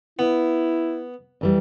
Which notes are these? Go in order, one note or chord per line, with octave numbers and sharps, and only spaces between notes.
B3 E4
F2 E3 G3